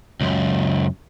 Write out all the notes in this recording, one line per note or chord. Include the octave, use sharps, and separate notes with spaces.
C#2 F#2